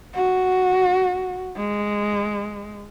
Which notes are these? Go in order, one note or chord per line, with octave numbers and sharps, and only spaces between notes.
F#4
G#3